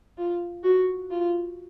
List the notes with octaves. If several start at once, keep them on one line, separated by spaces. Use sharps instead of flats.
F4
F#4
F4